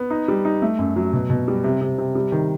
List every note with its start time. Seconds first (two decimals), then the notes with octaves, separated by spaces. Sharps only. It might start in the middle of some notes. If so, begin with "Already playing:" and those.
Already playing: B3
0.10 D#4
0.28 G3
0.45 D#4
0.62 A3
0.79 F#2
0.96 F#3
1.13 B2
1.30 B2
1.48 G3
1.64 C3
1.81 C3
1.98 C3
2.15 G3
2.32 D#3